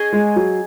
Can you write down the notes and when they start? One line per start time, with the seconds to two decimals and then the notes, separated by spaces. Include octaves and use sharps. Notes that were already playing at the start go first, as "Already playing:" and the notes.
Already playing: C#4 G#4 D#5 G#5
0.13 G#3
0.36 F#3